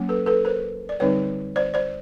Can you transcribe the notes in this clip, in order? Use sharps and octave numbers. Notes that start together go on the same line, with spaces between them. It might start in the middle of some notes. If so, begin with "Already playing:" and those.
Already playing: F#3 A#3 C#4
A4 B4
A4 B4
A#4 C5
D5
D3 G3 C4 D#4 B4 C#5
C5 D5
C5 D5